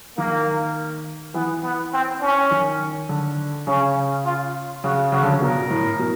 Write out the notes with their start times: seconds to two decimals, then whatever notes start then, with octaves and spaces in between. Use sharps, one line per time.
0.17 D#3 A#3
1.34 E3 B3
1.63 B3
1.93 C4
2.21 C#4
2.51 D#3
3.09 D3
3.67 C#3 C#4
4.25 F4
4.84 C#3 F#4
5.12 C#3 F#4
5.23 D3
5.32 C#3
5.41 B2 A#4
5.70 A2
5.99 B2